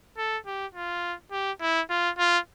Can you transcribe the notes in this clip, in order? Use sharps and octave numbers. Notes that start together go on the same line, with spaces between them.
A4
G4
F4
G4
E4
F4
F4